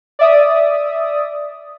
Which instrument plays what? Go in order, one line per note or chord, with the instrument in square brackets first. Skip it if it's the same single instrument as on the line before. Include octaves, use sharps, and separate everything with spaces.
[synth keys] D5 E5 D#6